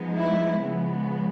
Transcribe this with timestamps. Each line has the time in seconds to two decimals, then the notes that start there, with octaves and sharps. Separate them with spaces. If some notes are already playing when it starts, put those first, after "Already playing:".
Already playing: F3 G#3 B3 D#4
0.13 E4
0.61 C#3 F3 G#3 B3